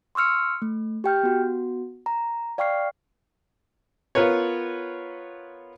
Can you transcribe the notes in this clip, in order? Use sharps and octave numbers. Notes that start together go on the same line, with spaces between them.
C6 C#6 E6 F6 C#7
A3
G4 G5 F6 G6
B3 F#4
A#5
D5 F5 G5 C#6 F6 C7
B3 F4 A#4 B4 C#5